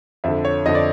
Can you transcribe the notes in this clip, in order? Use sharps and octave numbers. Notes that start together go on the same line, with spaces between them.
F2 D3 E5
C#5
F2 D3 D#5
D5